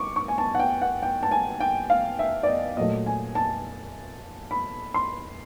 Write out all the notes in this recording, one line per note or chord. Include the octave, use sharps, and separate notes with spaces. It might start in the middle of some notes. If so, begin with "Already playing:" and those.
Already playing: C#6 D6
C#6
G#5
A5
F#5
G5
F#5
G5
A5
G#5
G5
F5
E5
D5
D#5
A#2 F#3 A3 D#5
G#5
A5
B5
C6